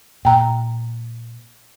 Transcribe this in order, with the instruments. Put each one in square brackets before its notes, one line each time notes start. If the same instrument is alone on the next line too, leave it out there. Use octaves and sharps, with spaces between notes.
[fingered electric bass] A#2 [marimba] G5 A#5